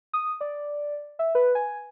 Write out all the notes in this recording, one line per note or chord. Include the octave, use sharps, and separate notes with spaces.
D#6
D5
E5
B4
G#5